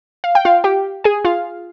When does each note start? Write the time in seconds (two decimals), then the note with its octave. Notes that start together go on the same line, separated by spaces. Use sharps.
0.24 F5
0.35 G5
0.45 F4 F5
0.64 G4 G5
1.04 G#4 G#5
1.25 F4 F5